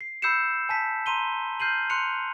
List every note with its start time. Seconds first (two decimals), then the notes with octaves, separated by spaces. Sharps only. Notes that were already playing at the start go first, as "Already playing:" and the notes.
0.01 C7
0.22 B5 E6 G6 C7 C#7 E7
0.69 G#5 A5 B6
1.06 A#5 C6 D#7 G7
1.60 F6 G6 C7 D#7 F#7
1.90 C6 F#6 G6 C#7 F7